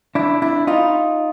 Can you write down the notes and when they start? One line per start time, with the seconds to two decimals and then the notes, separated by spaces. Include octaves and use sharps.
0.15 D4 E4
0.42 D4 E4
0.67 D#4 F4